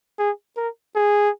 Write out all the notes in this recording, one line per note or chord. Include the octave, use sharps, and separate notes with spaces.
G#4
A#4
G#4